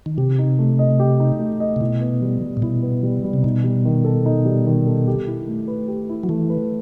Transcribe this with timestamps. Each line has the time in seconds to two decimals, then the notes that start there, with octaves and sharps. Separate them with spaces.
0.06 D#3
0.17 C3 G4
0.39 D#4
0.59 A3
0.79 D#5
1.00 G4
1.20 D#4
1.39 A3
1.60 D#5
1.76 C3
1.81 B2 E4
2.01 B3
2.22 G3
2.41 G3
2.57 A2
2.62 B2 E4
2.82 B3
3.03 G3
3.24 G3
3.33 C3
3.43 B2 D#4
3.64 G3
3.85 D#3
4.04 A4
4.26 D#4
4.45 G3
4.67 D#3
4.87 A4
5.07 G4
5.27 E4
5.47 A3
5.68 B4
5.88 G4
6.09 E4
6.23 F#3
6.29 E3 A3
6.50 B4